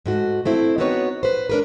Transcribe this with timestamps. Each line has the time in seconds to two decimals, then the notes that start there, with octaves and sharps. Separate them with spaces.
0.06 G#2 A3 F#4
0.45 A3 C4 E4
0.78 B3 C4 D#4 F#4 B4 C#5
1.23 B4 C5
1.50 D4 A#4 B4